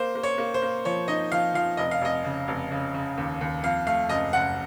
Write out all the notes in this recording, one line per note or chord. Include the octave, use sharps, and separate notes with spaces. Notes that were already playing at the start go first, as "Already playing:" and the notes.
Already playing: A#3 C5
A#3
C#5
A#3
C5
A#3
F3 C#5
D#4 D#5
F3 F5
F3 F5
F1 D#5
F5
F1 D#5
C#3
F1
C#3
C#3
D#2
D#2
F2 F5
A3 F5
F#1 D#5
F#1 F#5